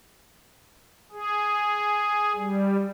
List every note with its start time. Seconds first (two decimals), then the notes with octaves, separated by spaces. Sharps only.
1.12 G#4
2.36 G3